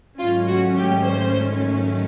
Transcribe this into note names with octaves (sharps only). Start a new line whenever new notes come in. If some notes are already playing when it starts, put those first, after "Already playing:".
G#2 D#3 F#3 A3 C#4 F4
F#4
G4
C5